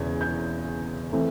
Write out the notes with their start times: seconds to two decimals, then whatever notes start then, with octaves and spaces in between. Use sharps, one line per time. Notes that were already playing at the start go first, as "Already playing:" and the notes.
Already playing: E1 E2 C#3 G#6
0.21 G6
1.12 E3 A3 C4